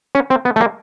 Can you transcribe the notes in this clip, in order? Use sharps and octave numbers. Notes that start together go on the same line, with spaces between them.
C#4
C4
B3
A3
A#3